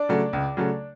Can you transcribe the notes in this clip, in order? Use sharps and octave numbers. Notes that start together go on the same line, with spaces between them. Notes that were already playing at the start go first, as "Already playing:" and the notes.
Already playing: D4 D5
C#3 F#3 A3
C#2
C#3 F#3 A3